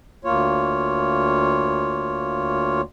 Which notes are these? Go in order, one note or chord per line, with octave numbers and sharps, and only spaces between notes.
D2 A#3 F4 C#5